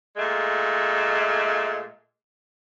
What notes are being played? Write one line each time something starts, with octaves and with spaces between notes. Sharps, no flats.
A#2 G#3 A3